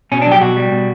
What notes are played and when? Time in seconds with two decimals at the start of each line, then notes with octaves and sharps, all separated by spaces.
0.12 B2 C#4
0.22 D4
0.26 F#3
0.31 G4
0.41 B2 F#4
0.57 G3
0.72 B2